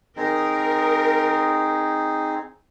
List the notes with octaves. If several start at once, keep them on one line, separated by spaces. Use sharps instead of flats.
C4 D#4 G#4 A#4